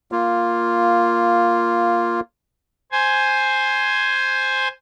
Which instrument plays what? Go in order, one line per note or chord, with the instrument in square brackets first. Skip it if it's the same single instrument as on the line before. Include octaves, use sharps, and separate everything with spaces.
[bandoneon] A#3 F4
[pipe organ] C5 G#5